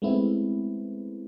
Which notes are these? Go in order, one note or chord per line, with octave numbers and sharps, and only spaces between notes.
G#3 A3 B3 C4 E4